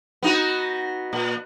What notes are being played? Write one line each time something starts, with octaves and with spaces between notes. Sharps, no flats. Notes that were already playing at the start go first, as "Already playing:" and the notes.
B3 D#4 F#4
A#2